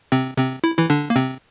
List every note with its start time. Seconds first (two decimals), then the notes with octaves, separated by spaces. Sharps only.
0.12 C3 C4
0.38 C3 C4
0.64 E4
0.78 E3 E4
0.90 D3 D4
1.10 A#3
1.16 C3 C4